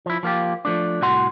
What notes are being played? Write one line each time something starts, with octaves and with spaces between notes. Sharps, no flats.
F3 E4
F3 A#3 F4 G4
F3 A3 D4
C2 A2 F#4 F#5 C6